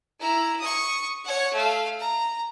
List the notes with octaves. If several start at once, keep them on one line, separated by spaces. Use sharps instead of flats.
E4 A#5
C#6 D#6
C#5 F#5
A3 F5
A#5